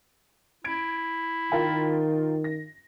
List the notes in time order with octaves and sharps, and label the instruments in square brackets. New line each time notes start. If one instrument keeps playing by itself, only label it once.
[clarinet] E4 [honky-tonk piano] G#6 D7
[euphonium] D#3 [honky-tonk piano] F4 A#4 G5
[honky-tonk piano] A#6